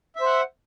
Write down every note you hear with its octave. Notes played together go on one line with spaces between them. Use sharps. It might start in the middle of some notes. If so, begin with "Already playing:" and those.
C5 E5 F#5